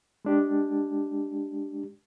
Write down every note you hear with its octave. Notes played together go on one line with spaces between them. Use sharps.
G#3 D4 G4